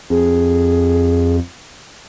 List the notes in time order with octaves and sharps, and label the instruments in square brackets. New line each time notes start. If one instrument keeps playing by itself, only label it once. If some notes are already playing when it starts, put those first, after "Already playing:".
[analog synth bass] F2 [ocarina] G#4